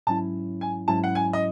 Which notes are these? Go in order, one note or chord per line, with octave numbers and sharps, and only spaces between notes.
G#2 F#3 C#4 E4 A5
G#5
G#2 F#3 C#4 E4 A5
F#5
G#5
D#5